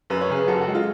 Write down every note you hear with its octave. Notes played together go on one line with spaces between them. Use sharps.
F#2 B4
C#5
C#3 G#4 B4
F#2 F#4 A4
F#4 A4
G#3
F4